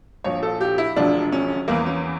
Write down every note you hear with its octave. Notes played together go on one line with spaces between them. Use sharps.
A#1 A#2 F3 C#5
A4
G4
E4
E1 D2 D3 F3 D4
C#4
E2 E3 A#3
C#4